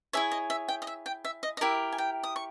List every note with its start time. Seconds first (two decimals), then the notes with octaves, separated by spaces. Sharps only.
0.13 E4 G#4 C#5 E5
0.32 D#5
0.50 E5
0.68 G5
0.82 D#5
0.87 E5
1.06 G5
1.25 E5
1.43 D#5
1.57 D#5
1.61 E4 G4 A#4 E5
1.92 G#5
1.98 G5
2.23 D#6
2.36 C#6